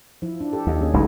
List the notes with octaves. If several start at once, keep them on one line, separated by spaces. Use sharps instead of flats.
F3 E4
D4
G4 A4
D#2
A#3 C#4 G#4
F#1 C#2 A2 A3 D#4